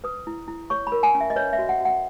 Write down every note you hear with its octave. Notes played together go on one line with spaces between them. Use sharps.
B4 D#6
E4
E4
C#5 C#6
B5
A#4
G#5
C#4
E5
D#5
B4 C#5
E5
F#4
F#5
F#4 F#5